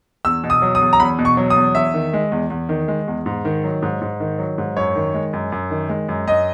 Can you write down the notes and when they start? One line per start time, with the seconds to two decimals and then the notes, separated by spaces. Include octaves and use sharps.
0.25 E2 E6
0.44 B2
0.50 D#6
0.62 F#3
0.75 D#6
0.81 E2
0.93 A#5
1.00 E2 B5
1.19 B2
1.25 C#6
1.37 F#3
1.50 D#6
1.56 E2
1.75 E2 E5
1.94 D#3
2.13 G#3
2.32 E2
2.50 E2
2.69 D#3
2.88 G#3
3.08 E2
3.26 G#2
3.45 D#3
3.64 F#3
3.82 G#2
4.01 G#2
4.20 D#3
4.39 F#3
4.58 G#2
4.77 F#2 C#5
4.96 D#3
5.14 G#3
5.33 F#2
5.52 F#2
5.70 D#3
5.89 G#3
6.09 F#2
6.27 F#2 D#5